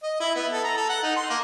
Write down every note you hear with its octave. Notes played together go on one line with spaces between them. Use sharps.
D#5
E4
B3
A4
A#5
A4
F#5
D#4
C6
A#3